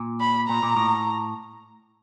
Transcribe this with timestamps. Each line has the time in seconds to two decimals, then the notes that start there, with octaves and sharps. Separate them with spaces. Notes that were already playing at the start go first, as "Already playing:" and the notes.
Already playing: A#2
0.20 B5
0.48 A#2 A#5
0.63 A#2
0.77 A2